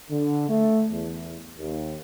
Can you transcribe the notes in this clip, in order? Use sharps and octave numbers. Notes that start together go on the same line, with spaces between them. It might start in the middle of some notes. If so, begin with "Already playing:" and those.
D3
A3
E2
D#2